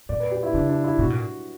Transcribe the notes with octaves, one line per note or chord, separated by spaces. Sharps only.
A#2 D5
B4
G4
E4
C#3 D4
D4
E4
B2 F#4
A#2